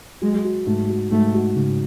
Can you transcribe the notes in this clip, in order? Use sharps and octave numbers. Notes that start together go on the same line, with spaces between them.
F#3 G#3
F#4
G#2 A3
F#4
G#2 A3
F#4
G#2 C#3